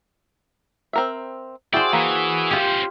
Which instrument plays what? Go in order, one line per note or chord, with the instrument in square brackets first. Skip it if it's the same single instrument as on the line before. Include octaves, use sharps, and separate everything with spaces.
[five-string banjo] C4 A#4 E5
[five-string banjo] E4 [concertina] F#4 G#4 E6 [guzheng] C5 G5 [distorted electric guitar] D5
[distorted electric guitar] E3 [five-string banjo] A#3
[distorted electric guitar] C#4 C5 [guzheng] F4 G4